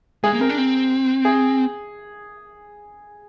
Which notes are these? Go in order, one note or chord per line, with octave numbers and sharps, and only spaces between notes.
G#3 G#4
A#3
C4 A#4
D4
C4
G#4